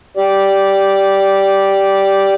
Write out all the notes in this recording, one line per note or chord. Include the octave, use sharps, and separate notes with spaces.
G4 D5